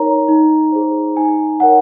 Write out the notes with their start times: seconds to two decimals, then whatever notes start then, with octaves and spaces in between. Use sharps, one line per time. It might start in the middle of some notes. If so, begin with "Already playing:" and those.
Already playing: D#4 A#4 C#5 A#5
0.29 D#4
0.72 G#4 C5
1.17 D#4 G#5
1.60 A#4 C#5 F#5